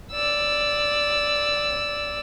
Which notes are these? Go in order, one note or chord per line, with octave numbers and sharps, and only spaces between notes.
D5 E6